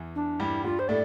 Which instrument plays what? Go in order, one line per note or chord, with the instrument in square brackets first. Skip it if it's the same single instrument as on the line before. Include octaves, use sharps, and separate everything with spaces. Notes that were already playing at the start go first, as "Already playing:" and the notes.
Already playing: [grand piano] E2 E3
[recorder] D4
[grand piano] G2 G3 [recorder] E4
[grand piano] G2 G3 [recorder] F4
[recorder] C5
[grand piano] A2 A3 [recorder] D5